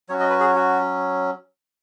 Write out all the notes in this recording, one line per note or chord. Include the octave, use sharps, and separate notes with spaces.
F#3 C#4 F#4 C#5
D#5
B4
G#4
F#4